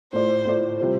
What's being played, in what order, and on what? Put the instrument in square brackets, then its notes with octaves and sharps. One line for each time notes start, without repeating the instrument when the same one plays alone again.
[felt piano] A2 A3 F4 D5 [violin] C5
[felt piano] A2 A3 F4 D5
C3 G3 F4 C5